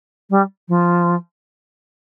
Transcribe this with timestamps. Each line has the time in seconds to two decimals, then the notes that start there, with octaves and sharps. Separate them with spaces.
0.30 G3
0.68 F3